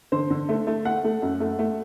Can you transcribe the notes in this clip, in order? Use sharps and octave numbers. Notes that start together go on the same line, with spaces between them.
D3 C5
D3
A3
A3
A3 F#5
A3
F#2
A3
A3